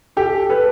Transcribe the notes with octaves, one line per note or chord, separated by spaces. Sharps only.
G4 A4
A4 B4